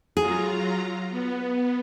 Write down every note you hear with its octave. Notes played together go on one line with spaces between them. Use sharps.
F#3 F4 G#4 A#5
B3